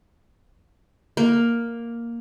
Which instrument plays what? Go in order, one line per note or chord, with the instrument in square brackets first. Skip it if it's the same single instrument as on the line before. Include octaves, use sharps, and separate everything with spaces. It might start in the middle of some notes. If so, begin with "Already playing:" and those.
[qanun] A#3